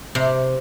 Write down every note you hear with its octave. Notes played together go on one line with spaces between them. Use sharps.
C3